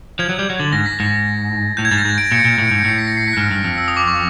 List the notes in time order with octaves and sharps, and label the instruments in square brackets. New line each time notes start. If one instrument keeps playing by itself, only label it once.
[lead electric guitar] F3 [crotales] G#6
[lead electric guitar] F#3
G3
F#3
[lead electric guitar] D3 [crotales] A6
[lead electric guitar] G#2 [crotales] A#6
[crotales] B6
[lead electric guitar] G#2 [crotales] B6
[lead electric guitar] A2 [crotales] G6
[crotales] G#6
[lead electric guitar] G#2 [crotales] A6
[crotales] A#6
[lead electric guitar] G#2
[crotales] D7
[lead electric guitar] A#2 [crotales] C#7
[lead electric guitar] A#2 [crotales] D7
[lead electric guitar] A2 [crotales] C#7
[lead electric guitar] G#2 [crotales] D7
[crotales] C#7
[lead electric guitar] A2 [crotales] C7
[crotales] B6
A#6
C7
B6
F#6
[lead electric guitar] G#2 [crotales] F6
[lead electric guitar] G2
F2
[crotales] E6
D#6
D6
C#6